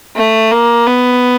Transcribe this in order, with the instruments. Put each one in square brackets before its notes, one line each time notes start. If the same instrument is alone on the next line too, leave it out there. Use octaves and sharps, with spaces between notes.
[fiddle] A3
A#3
B3